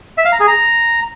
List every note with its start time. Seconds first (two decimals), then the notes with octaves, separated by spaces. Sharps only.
0.18 E5
0.25 F5
0.32 A#5
0.40 G#4
0.47 A#5